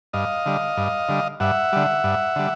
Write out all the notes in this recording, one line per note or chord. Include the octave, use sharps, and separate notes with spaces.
G2 D#5 F5
D3 G3
G2
D3 G3
G2 E5 F#5
D3 G3
G2
D3 G3